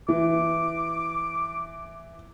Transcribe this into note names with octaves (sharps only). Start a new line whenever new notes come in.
E3 D6